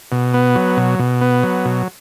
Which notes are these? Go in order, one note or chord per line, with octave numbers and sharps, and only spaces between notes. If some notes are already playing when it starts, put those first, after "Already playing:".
B2
B3
F#3
B2
B2
B3
F#3
B2